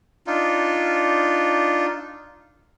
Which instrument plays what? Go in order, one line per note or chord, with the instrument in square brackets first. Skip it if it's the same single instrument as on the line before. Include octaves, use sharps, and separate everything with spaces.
[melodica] D4 D#4 F4